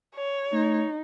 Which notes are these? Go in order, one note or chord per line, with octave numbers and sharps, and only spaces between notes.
C#5
A3 D#4